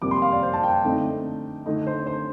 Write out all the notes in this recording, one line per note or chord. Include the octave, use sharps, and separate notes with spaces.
F2 C3 G3 A#3 D6
C6
F5
D5
C5
A5
G5
D3 A3 C4 D#4
D3 A3 D#4
C5
C5